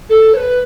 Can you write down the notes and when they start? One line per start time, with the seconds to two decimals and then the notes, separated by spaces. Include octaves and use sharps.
0.09 A4
0.33 C#5
0.37 B4